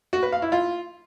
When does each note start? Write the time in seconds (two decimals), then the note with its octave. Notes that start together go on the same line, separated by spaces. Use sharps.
0.13 F#4
0.23 B4
0.32 F5
0.42 E4
0.52 F4